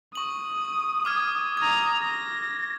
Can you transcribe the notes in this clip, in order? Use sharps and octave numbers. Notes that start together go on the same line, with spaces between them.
C#6 D#6 F#7
D6 F6 G#6
A#5 D#6 G#6
A#6